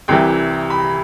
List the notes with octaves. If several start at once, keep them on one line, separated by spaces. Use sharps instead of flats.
C2 C3 E3 G3 G5
B5